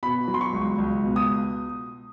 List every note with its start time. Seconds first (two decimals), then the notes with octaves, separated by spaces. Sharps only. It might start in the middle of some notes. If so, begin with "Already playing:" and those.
0.03 B2 B5
0.28 F#3
0.34 C6
0.41 C#6
0.53 C#2
0.78 C#2
1.03 B2
1.16 D#6